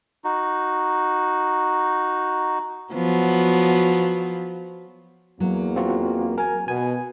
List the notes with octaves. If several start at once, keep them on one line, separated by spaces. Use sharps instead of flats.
D#4 F#4
F3 F#3 B3
E2 F#3 A#3
C4 F4 F#4
A#4 G#5
B2 B3 G#5